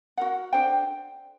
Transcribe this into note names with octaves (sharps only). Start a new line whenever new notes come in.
F#4 A#4 F#5
D4 A4 C5 G5